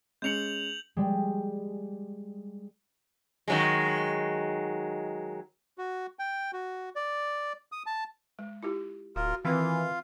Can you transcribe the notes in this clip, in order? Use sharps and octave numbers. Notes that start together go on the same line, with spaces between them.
G#3 C#4 G6 C#7 F7 F#7
G3 G#3
D#3 F#3 G#3
F#4
G5
F#4
D5
D#6
A5
G#3
E4 F4 G4
D1 F4 F#4 A#4
D#3 E3 C4 F4 B4 F5